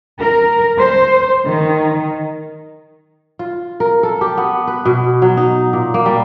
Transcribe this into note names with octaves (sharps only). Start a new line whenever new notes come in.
A#4
C5
D#3
F4
A#4
A4
G4
B3
B4
B2
F#3
D#4
A#2
A#3
G3